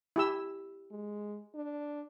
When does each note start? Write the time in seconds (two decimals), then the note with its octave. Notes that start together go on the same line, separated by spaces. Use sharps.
0.16 E4 G4 E6
0.91 G#3
1.55 D4